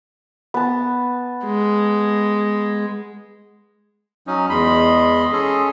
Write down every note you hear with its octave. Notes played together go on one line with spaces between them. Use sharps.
B3 A5
G#3
F#3 C#4 D#4
E2 G#3 D#5 B5 C6
C#4 G#4 A4